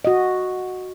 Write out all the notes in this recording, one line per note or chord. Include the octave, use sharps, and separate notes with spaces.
F#4 D#5